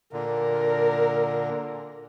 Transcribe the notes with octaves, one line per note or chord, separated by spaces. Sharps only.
A#2 D3 A#4